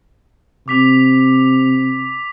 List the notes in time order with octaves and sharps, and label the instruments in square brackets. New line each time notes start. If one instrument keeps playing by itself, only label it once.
[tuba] C3 [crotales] D6 B6 F7